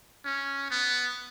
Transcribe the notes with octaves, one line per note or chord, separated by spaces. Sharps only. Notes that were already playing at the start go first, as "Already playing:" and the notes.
C#4
B3